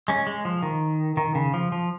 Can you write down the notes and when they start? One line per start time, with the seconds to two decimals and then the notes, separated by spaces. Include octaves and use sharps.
0.08 G#3 C#4
0.27 G#3
0.45 F3
0.63 D#3
1.17 D#3
1.35 C#3
1.54 F3
1.72 F3